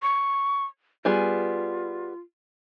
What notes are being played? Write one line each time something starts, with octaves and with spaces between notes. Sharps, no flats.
C#6
G3 B3 F4 G#4